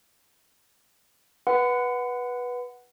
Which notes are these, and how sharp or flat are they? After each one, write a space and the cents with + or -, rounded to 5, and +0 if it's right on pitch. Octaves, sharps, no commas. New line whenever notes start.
B4 -10 F#5 +0 B5 +45